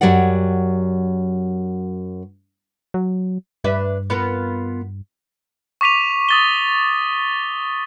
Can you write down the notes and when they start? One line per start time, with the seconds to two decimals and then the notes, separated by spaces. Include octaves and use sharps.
0.01 F#2 D#3 F#3 G4 D5 F#5
2.94 F#3
3.64 G2 D4 B4 E5
4.10 B3 F4 A#4
5.81 C#6 D6 B6 D#7 F7
6.29 D#6 A6 G7